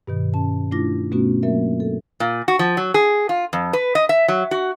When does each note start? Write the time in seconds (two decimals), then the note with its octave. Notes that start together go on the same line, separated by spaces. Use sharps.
0.07 G2 B2 D#3
0.34 C#4 A5
0.71 A3 D4 E4 F4 D6 A#6
1.12 B2 A3 B3 C#4 F#4
1.43 F#3 A#3 C4 A#4 E5
1.80 A4
2.20 A#2
2.48 F#4
2.59 F3
2.77 F#3
2.94 G#4
3.29 F4
3.53 F2
3.73 B4
3.95 D#5
4.09 E5
4.28 F#3
4.51 F#4